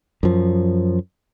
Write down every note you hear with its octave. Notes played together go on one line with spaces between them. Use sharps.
F#2 F3